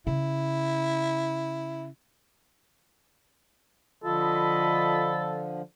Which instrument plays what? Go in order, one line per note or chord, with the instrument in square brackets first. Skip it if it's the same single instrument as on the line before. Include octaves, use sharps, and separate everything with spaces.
[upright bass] C#3 [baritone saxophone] E4
[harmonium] D3 F3 [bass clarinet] F4 [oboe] A4 [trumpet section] D#5 B5